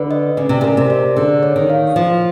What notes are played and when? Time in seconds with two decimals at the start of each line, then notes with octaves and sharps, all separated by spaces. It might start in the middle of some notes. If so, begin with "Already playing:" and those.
Already playing: D3 B4
0.11 D#5
0.37 C#3 D5
0.49 C3
0.61 C#3 A#4
0.77 C3
0.90 D5
1.16 D3 G#4
1.43 C#5
1.56 D#3
1.70 F5
1.96 F3 C5